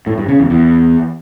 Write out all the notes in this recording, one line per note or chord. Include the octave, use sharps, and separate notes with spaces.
A2
G2
C#3
E2
E2